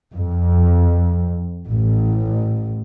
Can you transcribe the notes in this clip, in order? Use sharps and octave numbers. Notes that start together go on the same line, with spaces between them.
F2
A1